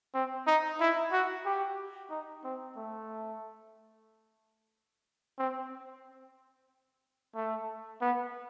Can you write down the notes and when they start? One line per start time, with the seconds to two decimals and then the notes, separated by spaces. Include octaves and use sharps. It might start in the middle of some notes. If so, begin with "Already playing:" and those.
0.14 C4
0.47 D#4
0.80 E4
1.12 F#4
1.45 G4
2.10 D#4
2.44 C4
2.76 A3
5.39 C4
7.36 A3
8.01 B3